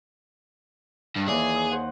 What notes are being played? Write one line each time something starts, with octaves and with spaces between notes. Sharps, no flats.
G2
D#2 E3 G#4 D5
D#6
C5 F#5